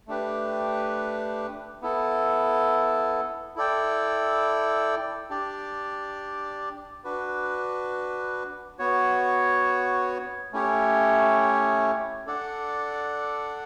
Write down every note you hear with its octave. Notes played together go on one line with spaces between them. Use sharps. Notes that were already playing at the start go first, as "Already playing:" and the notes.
A3 D4 G4 B4
B3 E4 A4
E4 A4 D5 G5
D4 G4 D5
D4 F#4 B4
B3 F#4 C#5
A3 C#4 E4 G4 C#5
D4 A4 D5 F#5